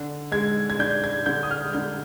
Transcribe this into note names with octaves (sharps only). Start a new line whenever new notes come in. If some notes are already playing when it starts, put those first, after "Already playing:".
Already playing: D3
G#3 G#6
G#6
D4 G6
G#6
D3 G6
D#6
F6
D3 G6